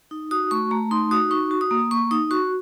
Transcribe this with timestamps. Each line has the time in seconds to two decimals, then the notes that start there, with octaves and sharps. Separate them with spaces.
0.11 D#4
0.31 F#4 D#6
0.51 A3 C#6
0.71 A3 A#5
0.91 D#4 C6
1.11 F#4 D#6
1.31 D#4 C#6
1.51 F#4
1.61 D#6
1.71 A#3
1.91 A#3 C#6
2.11 D#4 D#6
2.31 F#4 C#6